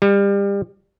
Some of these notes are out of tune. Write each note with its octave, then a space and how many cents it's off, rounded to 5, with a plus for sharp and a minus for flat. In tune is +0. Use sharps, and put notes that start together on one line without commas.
G3 +30